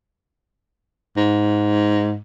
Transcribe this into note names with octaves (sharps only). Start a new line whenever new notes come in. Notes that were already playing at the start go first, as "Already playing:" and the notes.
G#2